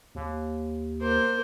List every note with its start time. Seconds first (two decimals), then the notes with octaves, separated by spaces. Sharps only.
0.15 D#2
1.00 A#3 C5